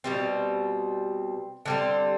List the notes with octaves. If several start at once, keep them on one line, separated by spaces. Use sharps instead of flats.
B2 G3 C4
D3 G3 C4